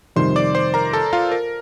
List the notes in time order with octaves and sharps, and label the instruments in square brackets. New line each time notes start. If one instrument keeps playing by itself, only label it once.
[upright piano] F2 C3 D#3 G3 [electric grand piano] C5 C6
[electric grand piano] D5 D6
C5 C6
A#4 A#5
A4 A5
F4 F5
A#4